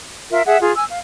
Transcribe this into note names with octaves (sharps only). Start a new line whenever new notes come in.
F4 A#4 E5
G#4 E5 F#5
F4 G#4
G#5 E6
F5